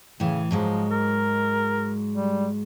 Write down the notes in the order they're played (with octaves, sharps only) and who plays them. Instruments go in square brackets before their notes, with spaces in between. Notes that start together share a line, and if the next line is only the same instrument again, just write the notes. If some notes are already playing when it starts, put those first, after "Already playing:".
[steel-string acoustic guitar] A2 E3 [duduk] C#3
[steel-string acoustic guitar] G#2 F#3 G#3 [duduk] F3
[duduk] A#4
G3